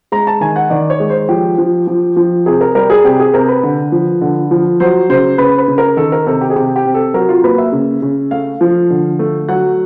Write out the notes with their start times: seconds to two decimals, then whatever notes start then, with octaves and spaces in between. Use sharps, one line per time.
0.12 G#3 A#5
0.27 A5
0.41 D#3 G#5
0.56 F#5
0.70 D#3 D5
0.90 C#5
1.00 G#3
1.10 C5
1.29 F3 G4
1.58 F3
1.87 F3
2.17 F3
2.46 C3 G#4
2.61 A#4
2.75 G3 A#4
2.90 G#4
3.04 C3 G4
3.20 G#4
3.34 C3 A#4
3.48 B4
3.63 D3
3.92 F3
4.21 D3
4.51 F3
4.80 F#3 C5
5.09 C#3 C5
5.38 C#3 B4
5.58 B4
5.68 C#3
5.78 A#4
5.97 D#3 A4
6.12 A#4
6.26 C3 A4
6.41 G4
6.50 G#4
6.56 C3 G4
6.76 G4
6.85 C3
6.94 A4
7.14 F#3 A#4
7.29 F4
7.44 A#3 B4
7.58 E5
7.72 C#3
8.02 C#3
8.31 A3 F5
8.61 F3
8.90 D3
9.19 A3
9.49 F#3 F#5